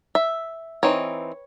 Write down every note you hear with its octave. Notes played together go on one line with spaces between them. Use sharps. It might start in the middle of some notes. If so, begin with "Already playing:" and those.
E5
E3 C4 D#4 C#5